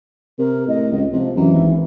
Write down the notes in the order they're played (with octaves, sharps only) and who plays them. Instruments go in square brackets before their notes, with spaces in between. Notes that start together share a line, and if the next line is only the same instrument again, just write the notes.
[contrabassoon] C3 [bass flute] A#4
[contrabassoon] A2 [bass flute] D#5
[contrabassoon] C#2
[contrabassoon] C3 [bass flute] F3
[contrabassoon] F#2 [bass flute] E3
[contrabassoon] G#1